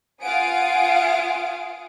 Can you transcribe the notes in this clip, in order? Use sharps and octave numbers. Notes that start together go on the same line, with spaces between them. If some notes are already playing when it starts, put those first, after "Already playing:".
F4 F5 F#5 G#5 D#6 D7